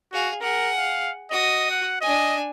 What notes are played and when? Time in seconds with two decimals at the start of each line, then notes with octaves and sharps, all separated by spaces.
0.13 F#4 G#4 F5
0.41 G#4 A#4 F#5
0.78 F5
1.31 F#4 D#5 D#6
1.71 F#5
2.01 D4 D#5 G#5